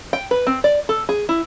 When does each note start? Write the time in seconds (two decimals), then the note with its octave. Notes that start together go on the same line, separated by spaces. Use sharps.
0.13 G5
0.31 B4
0.47 C4
0.64 D5
0.89 A4
1.09 G#4
1.29 E4